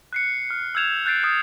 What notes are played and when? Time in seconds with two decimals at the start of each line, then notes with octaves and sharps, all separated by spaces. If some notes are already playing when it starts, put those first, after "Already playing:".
0.13 F#6 C7 C#7
0.50 F6
0.75 E6 F6 G6 G#6 E7 F7
1.06 F#6 G6 A6 C7 D7
1.23 D#6 F6